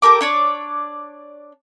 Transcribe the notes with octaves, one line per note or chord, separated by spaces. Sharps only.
G4 A4 A#4 D6
D4 C#5 D5